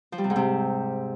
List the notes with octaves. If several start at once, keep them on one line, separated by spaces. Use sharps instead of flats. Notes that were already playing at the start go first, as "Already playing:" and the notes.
F3
G3
C3
G#2
C3